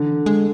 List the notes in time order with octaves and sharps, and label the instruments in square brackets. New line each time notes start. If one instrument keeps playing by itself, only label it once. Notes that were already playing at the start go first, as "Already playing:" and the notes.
Already playing: [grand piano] D3 [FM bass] E3
[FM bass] G#3